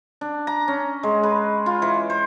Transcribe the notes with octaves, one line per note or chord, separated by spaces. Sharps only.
D4
A#5
C#4
G#3
B4
F4
E3
C5